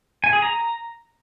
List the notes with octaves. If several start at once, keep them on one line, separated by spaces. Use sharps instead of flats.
G#5
G#4
A#5